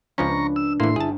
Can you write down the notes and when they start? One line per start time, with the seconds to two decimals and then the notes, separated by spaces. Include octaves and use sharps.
0.18 C#2 F3 C#4 D4 B4 A#5 C#6
0.56 E6
0.80 A2 E3 A#3 E4 C6
0.96 G1 E4 G#4 A5